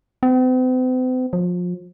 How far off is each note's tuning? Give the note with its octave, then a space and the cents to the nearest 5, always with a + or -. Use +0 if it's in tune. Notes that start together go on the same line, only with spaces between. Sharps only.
C4 -45
F3 +30